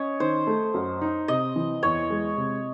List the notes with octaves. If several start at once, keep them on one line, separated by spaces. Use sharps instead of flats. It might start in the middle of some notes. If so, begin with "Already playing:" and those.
Already playing: C#4 C#5 D#5
D#3 C5
A3
F#2
D#4
C3 D#5
E3
E2 C#5
G#3
C3